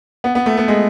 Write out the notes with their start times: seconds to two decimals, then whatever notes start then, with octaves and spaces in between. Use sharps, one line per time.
0.24 B3
0.35 B3
0.46 A3
0.57 B3
0.68 G#3